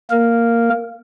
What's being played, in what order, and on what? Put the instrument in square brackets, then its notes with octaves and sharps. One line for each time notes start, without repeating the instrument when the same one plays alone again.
[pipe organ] A#3 A#4